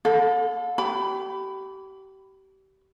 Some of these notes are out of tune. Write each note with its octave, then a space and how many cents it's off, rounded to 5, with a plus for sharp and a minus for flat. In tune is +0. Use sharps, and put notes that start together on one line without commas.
A4 +5 F5 +45 B5 +40
G4 -30 B5 +15